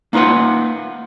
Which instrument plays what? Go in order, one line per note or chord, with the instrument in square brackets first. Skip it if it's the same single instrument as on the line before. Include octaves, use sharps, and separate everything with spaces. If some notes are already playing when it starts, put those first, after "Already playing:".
[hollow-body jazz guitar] A#3 D#4 F4 B4 F#5